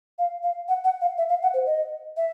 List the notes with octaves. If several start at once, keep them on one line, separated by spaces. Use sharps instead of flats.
F5
F5
F#5
F#5
F5
E5
F5
F#5
C5
D#5
E5